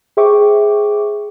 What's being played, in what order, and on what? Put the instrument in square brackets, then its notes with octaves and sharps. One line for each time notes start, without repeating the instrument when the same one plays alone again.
[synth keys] G#4 C5 E5 G5 C#6 D6